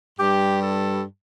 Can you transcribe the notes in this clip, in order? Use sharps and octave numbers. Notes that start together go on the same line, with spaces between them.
G2 G3 G4
A4